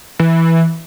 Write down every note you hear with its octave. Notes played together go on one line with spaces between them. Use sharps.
E3